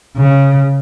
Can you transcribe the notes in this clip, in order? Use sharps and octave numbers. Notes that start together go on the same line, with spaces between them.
C#3